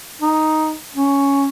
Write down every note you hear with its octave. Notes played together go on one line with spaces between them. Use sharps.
D#4
C#4